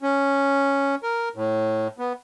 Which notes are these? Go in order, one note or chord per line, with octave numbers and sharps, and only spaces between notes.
C#4
A#4
A2
B3